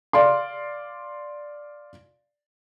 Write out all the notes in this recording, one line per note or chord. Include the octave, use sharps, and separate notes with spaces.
D5 F5 C6